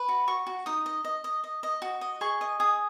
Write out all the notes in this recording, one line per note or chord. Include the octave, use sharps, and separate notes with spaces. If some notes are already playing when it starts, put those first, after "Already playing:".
Already playing: B4
F#4
F#4 C#6
F#4
D#4 D#6
D#5
D#5
D#5
D#5
D#5
F#4
D#5
G#4 C#6
D#5
G#4 D#6